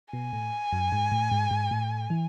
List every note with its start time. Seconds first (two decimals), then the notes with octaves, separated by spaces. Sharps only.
0.13 B2 G#5
0.33 A2
0.73 F#2
0.92 G#2
1.12 A2
1.32 G#2
1.51 G#2
1.71 A2
2.10 E3